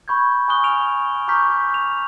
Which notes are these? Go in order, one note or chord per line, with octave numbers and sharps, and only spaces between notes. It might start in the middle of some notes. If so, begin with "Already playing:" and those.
B5 C#6 G6 G#6
G#5 C#6 D#6 F#6 G7
F6 D7 F7
A#5 C#6 D6 F6 G6 B6
G6
F7